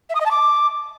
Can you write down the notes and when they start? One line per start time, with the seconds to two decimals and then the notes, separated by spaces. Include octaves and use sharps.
0.10 E5
0.15 D#6
0.20 D#5
0.26 A5
0.31 D6